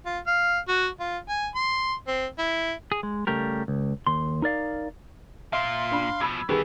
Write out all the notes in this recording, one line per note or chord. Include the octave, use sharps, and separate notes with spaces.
F4
F5
F#4
F4
G#5
C6
C4
E4
G#4
G#3
C#3 G3 A3 G4 A#4
C#2
D#2 C6
D#4 A#4 D5 F5
A#2 E5 F5 C6
D4 B5
B2 F3 B5 E6 G#6
D#3 E3 G3 B3 G#4 B4